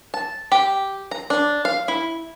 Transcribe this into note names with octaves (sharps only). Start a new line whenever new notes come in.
A5
G4
A#5
D4
F5
E4